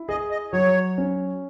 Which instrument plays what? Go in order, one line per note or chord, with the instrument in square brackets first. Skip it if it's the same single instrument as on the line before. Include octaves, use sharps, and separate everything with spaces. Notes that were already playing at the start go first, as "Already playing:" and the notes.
Already playing: [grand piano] E4
[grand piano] G#4 [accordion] D#5
[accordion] D#5
[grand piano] F#3 [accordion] C#5
[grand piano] C#4